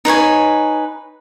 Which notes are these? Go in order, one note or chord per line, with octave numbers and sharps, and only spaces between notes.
D#4 B4 C#5 G#5